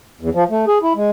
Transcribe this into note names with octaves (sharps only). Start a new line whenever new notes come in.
E2
F3
A3
G#4
E4
G#3